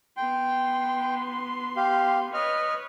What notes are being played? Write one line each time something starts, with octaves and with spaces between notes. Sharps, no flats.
B3 G5 C6
G4 F5
B4 C#5 D#5 F6